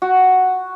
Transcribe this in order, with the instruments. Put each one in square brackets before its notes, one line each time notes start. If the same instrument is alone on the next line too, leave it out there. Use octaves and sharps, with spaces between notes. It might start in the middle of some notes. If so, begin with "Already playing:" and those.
[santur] F#4